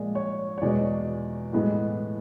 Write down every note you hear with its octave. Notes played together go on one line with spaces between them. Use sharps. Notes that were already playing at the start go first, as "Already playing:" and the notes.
Already playing: A#2 F3 G#3 D5
C#5
C#5
E2 B2 G#3 D5
A2 E3 G#3 B3